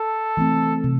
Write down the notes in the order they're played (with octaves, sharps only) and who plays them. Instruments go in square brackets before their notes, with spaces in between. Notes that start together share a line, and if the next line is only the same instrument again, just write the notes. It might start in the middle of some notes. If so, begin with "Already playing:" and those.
Already playing: [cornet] A4
[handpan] E3 A3 C4
C3